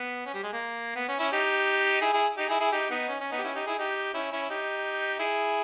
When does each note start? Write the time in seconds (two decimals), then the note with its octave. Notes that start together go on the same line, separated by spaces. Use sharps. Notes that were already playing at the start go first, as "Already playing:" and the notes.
Already playing: B3
0.26 C#4
0.34 G3
0.43 G#3
0.53 A#3
0.96 B3
1.09 C#4
1.19 C#4 E4
1.32 D#4 G4
2.02 E4 G#4
2.13 E4 G#4
2.37 D#4 G4
2.49 E4 G#4
2.60 E4 G#4
2.72 D#4 G4
2.90 B3 D#4
3.08 C#4
3.20 C#4
3.31 B3 D#4
3.38 G4
3.44 C#4 E4
3.55 D#4 G4
3.66 E4 G#4
3.78 D#4 G4
4.14 C#4 E4
4.32 C#4 E4
4.49 D#4 G4
5.19 E4 G#4